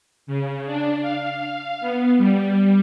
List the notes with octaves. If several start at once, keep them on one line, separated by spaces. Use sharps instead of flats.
C#3
D4
F5
B3
G3